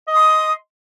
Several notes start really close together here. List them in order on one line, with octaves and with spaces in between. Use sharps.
D#5 D#6 C6